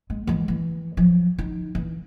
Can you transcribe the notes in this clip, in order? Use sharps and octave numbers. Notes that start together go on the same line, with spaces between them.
G#3
E3 G#3
E3
F3 F#3
D#4
E3